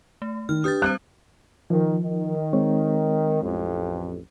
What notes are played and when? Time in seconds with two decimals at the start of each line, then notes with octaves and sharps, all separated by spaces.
0.22 A3
0.49 D#3 F6
0.64 D4 G4 B4 D#6 G6 A6
0.82 G3 C4 C5 F#6
1.70 D#3 F3
2.02 D#3
2.53 G#3 C4 C#5
3.42 A1 F2